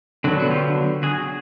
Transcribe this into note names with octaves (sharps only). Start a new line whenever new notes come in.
D3 F#3 B3 F#4
F#4
F4 G4
F#4 G#4